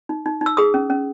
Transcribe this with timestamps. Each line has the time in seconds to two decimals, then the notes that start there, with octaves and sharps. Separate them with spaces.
0.09 D#4
0.26 D#4
0.41 D#4
0.46 E6
0.57 G#4 D#6
0.74 C#4
0.90 C#4